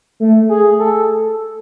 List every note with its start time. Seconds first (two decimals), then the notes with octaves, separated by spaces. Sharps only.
0.20 A3
0.49 G#4
0.80 A4